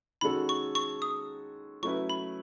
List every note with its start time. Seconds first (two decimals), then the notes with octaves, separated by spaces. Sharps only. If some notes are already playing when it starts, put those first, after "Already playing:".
0.21 D#3 G#3 C#4 F#4 A4 B5
0.49 C#6
0.75 C#6
1.02 D#6
1.82 F#3 A3 C#4 E4 B4 C#6
2.10 B5